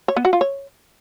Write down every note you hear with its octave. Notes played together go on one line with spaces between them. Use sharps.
C#5
B3
F#4
F4
C#5